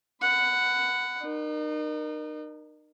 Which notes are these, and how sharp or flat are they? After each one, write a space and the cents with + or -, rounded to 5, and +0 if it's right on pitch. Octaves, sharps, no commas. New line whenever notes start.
F#5 +0 B5 +25
D#4 -40 A#4 +15